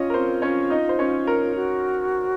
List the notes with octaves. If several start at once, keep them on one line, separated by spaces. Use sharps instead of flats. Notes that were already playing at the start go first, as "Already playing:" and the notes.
Already playing: C#4 F4 C#5 D#5
A#4
C4 C5
C#4 C#5
D#4 D#5
C5
C#4 C#5
A#4
F#4